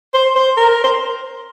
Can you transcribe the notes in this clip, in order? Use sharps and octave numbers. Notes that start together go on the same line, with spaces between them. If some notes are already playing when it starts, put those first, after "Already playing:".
C5
C5
A#4
C5